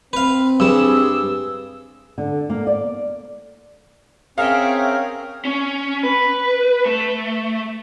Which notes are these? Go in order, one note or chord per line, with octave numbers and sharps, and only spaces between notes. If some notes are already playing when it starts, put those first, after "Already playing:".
C4 B4 F5
G2 G3 G#4 E6
D3
A#3
D5
C4 C#4 G#4 A#4 C#5 E5 F5 G5
C#4
B4
A3